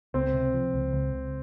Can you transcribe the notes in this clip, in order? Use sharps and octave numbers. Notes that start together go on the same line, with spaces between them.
C#2 C4
C3
F3
C#2
C#2
C#2